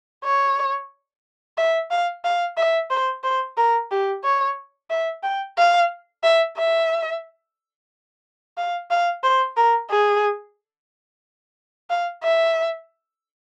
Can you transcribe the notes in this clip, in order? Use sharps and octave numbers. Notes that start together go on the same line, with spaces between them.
C#5
E5
F5
F5
E5
C5
C5
A#4
G4
C#5
E5
G5
F5
E5
E5
F5
F5
C5
A#4
G#4
F5
E5